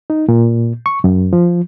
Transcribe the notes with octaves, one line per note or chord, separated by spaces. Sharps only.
D#4
A#2
C#6
F#2
F3